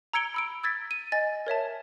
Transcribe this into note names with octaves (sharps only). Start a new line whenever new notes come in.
A#5 E6 G#6 C#7 D7 G7
B5 E6 D7
E6 G#6 A6 B6
D#7
D#5 G#5 A6
A#4 C#5 E5 A5